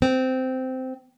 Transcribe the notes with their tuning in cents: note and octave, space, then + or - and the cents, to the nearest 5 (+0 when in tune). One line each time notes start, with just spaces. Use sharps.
C4 -15